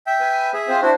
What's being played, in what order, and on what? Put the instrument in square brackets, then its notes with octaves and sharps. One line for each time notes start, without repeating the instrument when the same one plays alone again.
[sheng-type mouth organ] E5 G5
[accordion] B4 G#5
[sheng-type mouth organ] G#4 E5
[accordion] C4 F4 C5
[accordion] D4 C5 [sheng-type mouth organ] E4 F#4